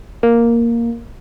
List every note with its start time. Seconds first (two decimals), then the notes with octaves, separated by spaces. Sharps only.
0.23 A#3